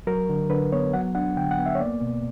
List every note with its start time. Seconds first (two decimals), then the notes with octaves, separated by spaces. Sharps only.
0.07 F#3 A#4
0.29 D3
0.50 D3 B4
0.72 B3 C#5
0.94 F#3 F#5
1.15 D4 F#5
1.37 D3 G5
1.51 F#5
1.59 B3
1.66 E5
1.75 C#5
1.80 A#3 D5
2.01 B2